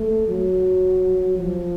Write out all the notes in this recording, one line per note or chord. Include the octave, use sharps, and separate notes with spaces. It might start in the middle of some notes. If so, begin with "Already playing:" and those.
Already playing: A3
F#3
F3